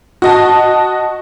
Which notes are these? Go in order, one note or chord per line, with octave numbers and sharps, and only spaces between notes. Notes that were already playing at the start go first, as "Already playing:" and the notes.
F#4 D#5 A5